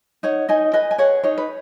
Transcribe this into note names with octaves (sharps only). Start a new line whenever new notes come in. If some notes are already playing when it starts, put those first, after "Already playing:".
D#4 C#5 F#5
D#4 D#5 G#5
B4 D#5 G#5
G#5
G#4 C#5 F#5
D#4 C#5
B4